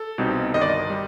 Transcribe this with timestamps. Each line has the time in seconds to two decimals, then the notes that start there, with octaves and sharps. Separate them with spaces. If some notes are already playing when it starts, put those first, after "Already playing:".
Already playing: A4
0.18 C2 B2 G3 C4 D#4
0.54 G1 G2 D#3 G3 D#5
0.62 D5
0.69 D#5
0.90 G3